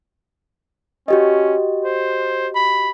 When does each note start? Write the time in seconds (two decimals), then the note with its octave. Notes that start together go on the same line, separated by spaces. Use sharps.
1.08 C#4 F#4 G4 D#5
1.85 C5
2.55 B5